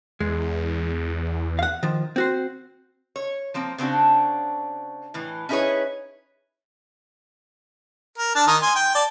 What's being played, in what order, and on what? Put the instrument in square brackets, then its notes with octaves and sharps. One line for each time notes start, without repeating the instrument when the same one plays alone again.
[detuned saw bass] E2 [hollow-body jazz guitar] G#3
[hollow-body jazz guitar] F5 F#5
D#3 F3
C4 F#4 C5
[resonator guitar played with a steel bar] C#5
F3 A#3 C4
C#3 C4 D4 F#4
A2 E3
C#4 D#4 E4 G#4 B4 C#5
[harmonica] A#4
D4 A5
D#3 A#4 D#6
G#5 C6
G5
D5 A5